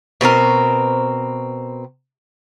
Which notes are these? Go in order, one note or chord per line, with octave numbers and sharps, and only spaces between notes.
B2 C4 D4 A#4